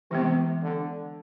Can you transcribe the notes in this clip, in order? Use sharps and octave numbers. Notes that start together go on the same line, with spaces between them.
C3 E3 G#3 B3
D3